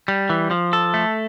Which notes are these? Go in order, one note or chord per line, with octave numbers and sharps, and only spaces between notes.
G3
E3
F3
A4
A3